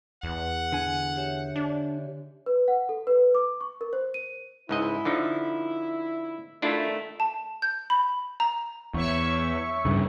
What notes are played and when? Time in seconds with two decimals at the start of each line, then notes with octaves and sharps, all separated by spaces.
0.23 E2 F#5
0.72 D3 G#5
1.16 G4 C#5 E5
1.56 D4
2.46 B4
2.68 F#5
2.89 A4
3.07 B4
3.35 D6
3.61 C#6
3.81 A#4
3.93 C5
4.14 D#7
4.69 C#2 G#2 E4 D#5
5.05 D3 F3 D#4
6.62 D#3 A3 D4 E4 F4
7.20 A5
7.62 G6
7.90 B5
8.40 A#5
8.94 E2 C#5 E5 C#6
9.85 G2 C#3